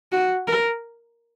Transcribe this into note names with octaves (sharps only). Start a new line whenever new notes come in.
F#4
A#4